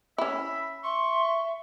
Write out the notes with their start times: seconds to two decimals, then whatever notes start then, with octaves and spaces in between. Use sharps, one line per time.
0.18 C#4 E4 E5 B5
0.84 E5 C6 C#6